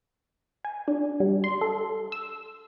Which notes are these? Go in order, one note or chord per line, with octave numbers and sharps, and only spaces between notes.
G#5
D4
G3
C6
A4
E6